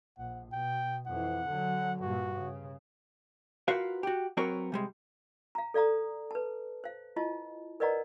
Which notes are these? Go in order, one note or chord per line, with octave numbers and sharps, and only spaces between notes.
A#1 F#5
B2 G5
F2 E3 F#5
D3 F#3
G2 A#2 F#4
C#3
F4 F#4 A#4 B4 F5
F#4 G4
F#3 C4 F#4 A#4 B4 C#5
C3 G3 G#3
F5 A#5
A4 D5 F5 A#5 D#6
B4 A5
C5 F5
E4 F4 D#5 A5
A#4 B4 D5 D#5 F#5 A#5